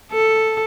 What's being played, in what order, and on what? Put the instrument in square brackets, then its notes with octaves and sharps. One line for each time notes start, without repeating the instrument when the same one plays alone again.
[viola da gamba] A4